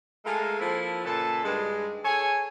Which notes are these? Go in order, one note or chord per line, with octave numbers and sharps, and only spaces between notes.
G#3 A3 F4 A4 A#4
F3 A#3 C4 E4 A4
A#2 C#3 A4 B4 A5
G2 D#3 G#3
G#4 A4 C#5 G#5